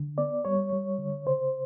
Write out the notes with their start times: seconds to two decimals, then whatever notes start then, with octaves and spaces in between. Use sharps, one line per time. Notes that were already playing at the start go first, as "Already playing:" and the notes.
Already playing: D3
0.18 B3 D5
0.45 G3 C#5
0.72 G3
0.99 D3
1.26 C#3 C5